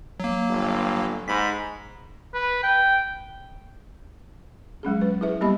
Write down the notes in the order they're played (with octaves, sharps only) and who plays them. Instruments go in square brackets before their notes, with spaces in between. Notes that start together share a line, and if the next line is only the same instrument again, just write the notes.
[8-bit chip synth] F#3 A#3
[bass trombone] G1
[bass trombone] G#2 [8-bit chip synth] B5 B6
[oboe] B4
G5
[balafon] F#3 G#3 C#4 G#4
B4
E4 G#4 B4 E5
G3 A#3 B3 G4 D#5 B5